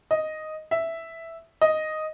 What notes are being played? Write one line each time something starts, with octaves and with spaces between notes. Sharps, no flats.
D#5
E5
D#5